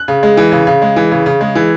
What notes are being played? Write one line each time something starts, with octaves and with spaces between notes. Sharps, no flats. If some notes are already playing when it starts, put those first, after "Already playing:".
Already playing: F#6
C#3
G#3
E3
C#3
C#3
G#3
E3
C#3
C#3
G#3
E3